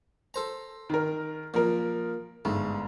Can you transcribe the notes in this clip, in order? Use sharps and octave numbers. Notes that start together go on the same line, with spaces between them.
A4 C5 A#5
D#3 A#4
A#2 F3 A#4
G1 G#2 A3